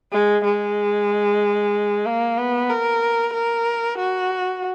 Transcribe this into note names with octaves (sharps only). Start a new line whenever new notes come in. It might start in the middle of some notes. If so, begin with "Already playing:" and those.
G#3
G#3
A#3
B3
A#4
A#4
F#4